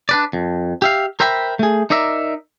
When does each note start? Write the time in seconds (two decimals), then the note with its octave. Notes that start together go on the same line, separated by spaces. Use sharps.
0.09 D4 B4 D5
0.33 F2
0.82 G4 E5 F5
1.20 A#4 C5 E5 G5 B5
1.59 A3 G#4
1.90 D#4 A#4 D5 E5